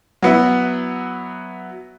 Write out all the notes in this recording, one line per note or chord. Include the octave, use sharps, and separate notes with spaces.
F#3 B3 E4